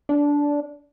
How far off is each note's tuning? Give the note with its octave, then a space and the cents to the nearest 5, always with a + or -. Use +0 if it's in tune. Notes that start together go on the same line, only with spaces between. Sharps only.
D4 -15